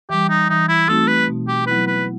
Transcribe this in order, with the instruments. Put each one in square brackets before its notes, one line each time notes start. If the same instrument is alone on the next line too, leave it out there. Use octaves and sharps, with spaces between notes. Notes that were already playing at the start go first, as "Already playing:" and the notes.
[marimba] E3 G3 [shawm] G4
[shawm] D#4
[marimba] E3 [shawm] D#4
[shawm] E4
[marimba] A3 C4 D#4 F#4 [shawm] A4
[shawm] B4
[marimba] B2
[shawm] G4
[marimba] F#3 B3 E4 [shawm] B4
[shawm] B4